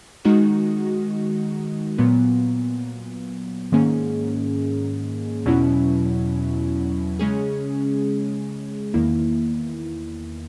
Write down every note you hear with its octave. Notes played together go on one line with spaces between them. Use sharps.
D#3 G#3 D#4 F#4
A#2 F#3 B3
G#2 D#3 A#3 C#4 G#4
E2 B2 F#3 C#4 E4
C#3 G#3 C#4 G#4
E2 D#3 A#3 E4